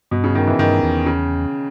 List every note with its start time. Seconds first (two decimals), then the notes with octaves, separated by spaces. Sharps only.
0.11 G2 B2
0.24 C#3
0.35 D#3
0.47 E3
0.59 G2 D#3
0.83 E2
1.06 C#3